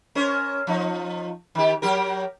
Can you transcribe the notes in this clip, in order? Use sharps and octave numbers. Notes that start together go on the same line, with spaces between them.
C#4 A#4 C5
F3 D#4
D#3 G4
F#3 G4 A#4